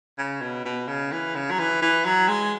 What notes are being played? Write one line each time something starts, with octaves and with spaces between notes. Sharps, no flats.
C#3
B2
B2
C#3
E3
C#3
F#3
E3
E3
F#3
G#3